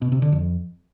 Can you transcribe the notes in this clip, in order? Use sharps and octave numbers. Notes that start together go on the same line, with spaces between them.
B2
C3
D3
F2